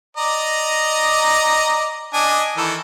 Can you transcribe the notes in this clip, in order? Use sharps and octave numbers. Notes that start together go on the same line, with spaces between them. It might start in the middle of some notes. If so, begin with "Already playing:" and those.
D5 D#5 A#5
D4 D#5 G#5
D#3 E3 A4